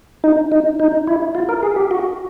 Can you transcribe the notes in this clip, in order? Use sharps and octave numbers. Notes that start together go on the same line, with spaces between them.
D#4
D#4
D#4
E4
F4
A#4
G#4
G4
F#4